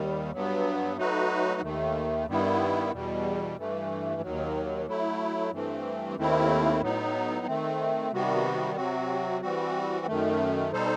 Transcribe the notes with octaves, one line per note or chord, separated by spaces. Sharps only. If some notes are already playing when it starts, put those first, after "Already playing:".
Already playing: D#2 D#3 G3
G2 F#3 B3
F#3 A3 D#4 F#4 B4
D#2 D#3 A3
G2 D#3 G3 B3 E4
E2 B2 G3
G2 E3 A3
D#2 D#3 F#3
F#3 A3 E4
G2 E3 A3 C4
D#2 D#3 A3 C4 E4
A2 F#3 B3 D#4
D#3 A3 C4
C3 D#3 G3 B3 F#4
C3 F#3 C4 F#4
E3 G3 C4 F#4
F#2 D#3 A3
B2 G3 D#4 A4 C5